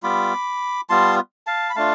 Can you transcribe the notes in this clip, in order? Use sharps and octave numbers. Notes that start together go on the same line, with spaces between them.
G3 B3 F4 B5 D6
G3 B3 F4 A5 C6
F5 A5
B5
A3 D4 F4 F5 A5